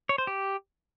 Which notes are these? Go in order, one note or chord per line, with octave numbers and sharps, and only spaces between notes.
C#5
C5
G4